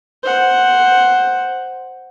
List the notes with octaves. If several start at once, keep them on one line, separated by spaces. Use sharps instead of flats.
C5 F#5